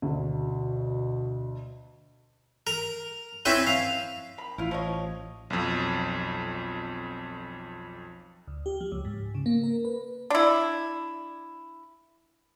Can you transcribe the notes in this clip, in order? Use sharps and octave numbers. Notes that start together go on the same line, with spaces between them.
D2 B2
A#4
C4 C#4 E4 B4
F5
D#3 B5
A1 E4 F4
F3 C#5 D#5
B1 F2
D2
G4
F3
C#2
G#2
C#3
A#3
A#4
B4
D4 E4